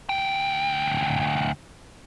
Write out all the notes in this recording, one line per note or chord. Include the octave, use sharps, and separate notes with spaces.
D2 G5